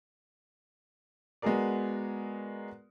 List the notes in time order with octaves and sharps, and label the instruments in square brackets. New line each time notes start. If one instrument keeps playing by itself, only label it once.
[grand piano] G#3 B3 F#4 G#4 A#4 D5